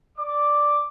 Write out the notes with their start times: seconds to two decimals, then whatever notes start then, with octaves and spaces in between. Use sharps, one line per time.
0.18 D5 D6